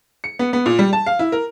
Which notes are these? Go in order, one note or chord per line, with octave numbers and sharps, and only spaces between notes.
C#7
B3
B3
A#2
G3
A5
F5
E4
A#4